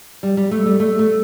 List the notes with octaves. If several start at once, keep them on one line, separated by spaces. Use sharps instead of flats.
G3
G3
A3
G3
A3
A3